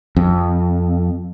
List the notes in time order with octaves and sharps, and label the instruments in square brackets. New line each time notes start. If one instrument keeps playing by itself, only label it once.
[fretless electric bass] F2